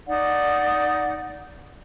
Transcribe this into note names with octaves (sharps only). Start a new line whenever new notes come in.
D#4 D5 F#5